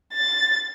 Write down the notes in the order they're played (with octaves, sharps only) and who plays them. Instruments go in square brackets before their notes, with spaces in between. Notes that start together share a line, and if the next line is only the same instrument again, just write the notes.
[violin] A6